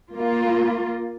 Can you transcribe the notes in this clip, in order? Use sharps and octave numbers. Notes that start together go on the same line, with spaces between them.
A#3 F4